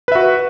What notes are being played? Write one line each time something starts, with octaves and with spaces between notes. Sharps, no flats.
F#4 B4 E5